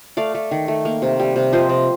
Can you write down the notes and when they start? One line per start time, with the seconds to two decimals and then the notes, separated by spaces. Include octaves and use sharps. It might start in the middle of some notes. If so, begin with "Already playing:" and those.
0.17 A3 D5 F5
0.35 A3
0.51 D#3
0.68 A3
0.85 A#3
1.02 C3
1.20 G3
1.36 C3
1.53 F3 C5 D#5
1.69 C3